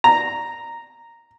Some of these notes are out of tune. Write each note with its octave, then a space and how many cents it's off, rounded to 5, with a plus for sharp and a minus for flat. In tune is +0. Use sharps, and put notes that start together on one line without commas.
A#5 -5